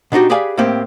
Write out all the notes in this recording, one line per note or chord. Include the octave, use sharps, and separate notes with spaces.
B2 D4 D#4 F#4 G4
G4 G#4 B4 D5 F5 G#5
A2 A#3 C4 G4